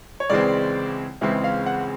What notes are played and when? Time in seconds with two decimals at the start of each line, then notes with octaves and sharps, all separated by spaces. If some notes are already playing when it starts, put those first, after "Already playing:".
0.20 C#5
0.30 C#2 C#3 E3 G#3 C4 D5
1.21 C#2 C#3 E3 G#3 C4 E5
1.44 F5
1.66 F#5